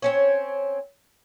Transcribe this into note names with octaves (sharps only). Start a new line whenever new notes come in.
C4 C#4 C#5